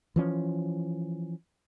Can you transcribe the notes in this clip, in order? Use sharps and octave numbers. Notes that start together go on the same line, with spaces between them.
E3 F3 C#4